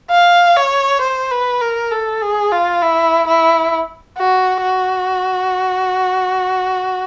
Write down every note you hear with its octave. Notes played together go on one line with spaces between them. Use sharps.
F5
C#5
C5
B4
A#4
A4
G#4
F4
E4
E4
F#4
F#4